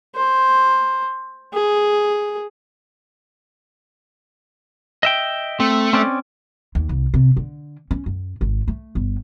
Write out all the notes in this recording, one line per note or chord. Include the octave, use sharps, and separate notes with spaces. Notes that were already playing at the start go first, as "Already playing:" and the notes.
C5
G#4
D#5 E5 G5
A3 C4
C4 C#4 D5
D#2
C2
C3
D3
C#4
F#2
G#1
A3
G1